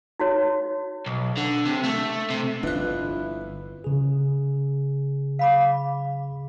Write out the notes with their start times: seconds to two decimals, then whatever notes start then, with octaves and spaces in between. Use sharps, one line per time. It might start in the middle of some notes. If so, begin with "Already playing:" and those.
0.20 D#4 F#4 C#5
1.06 B1
1.37 D3
1.66 C3
1.85 A3
2.30 C3
2.63 G1 F2 D4 E4 F4 B4 F#6
3.84 C#3 G#4
5.39 F5 B5 D6